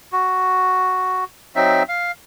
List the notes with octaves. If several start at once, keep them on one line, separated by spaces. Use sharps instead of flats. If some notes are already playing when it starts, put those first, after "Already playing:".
F#4
F#3 C4 D#4 E5
F5